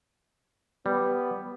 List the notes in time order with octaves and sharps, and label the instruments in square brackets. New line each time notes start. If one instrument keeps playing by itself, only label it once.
[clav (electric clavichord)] G3 [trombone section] B3